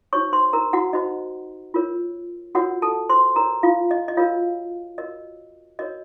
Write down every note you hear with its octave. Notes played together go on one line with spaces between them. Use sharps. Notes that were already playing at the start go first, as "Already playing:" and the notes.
D#4 F#4 C5 C#5 C#6
C5 C6
A#4 A#5
F#4 F#5
D#4 F#4 C5 D#5
F4 A#4 C#5
F4 F#4 A#4 C#5 F#5
A4 A5
C5 C6
F#4 A#4 C#5 A#5
F4 F5
D#5
D#5
F4 F#4 A#4 C#5 F5
F#4 A#4 C#5 D#5
F#4 A#4 C#5 D#5